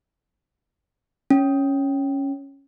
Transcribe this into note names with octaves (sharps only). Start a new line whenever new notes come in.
C#4